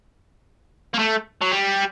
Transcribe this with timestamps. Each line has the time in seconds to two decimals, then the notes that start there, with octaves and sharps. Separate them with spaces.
0.94 A#3
0.99 A3
1.42 F#3
1.52 G3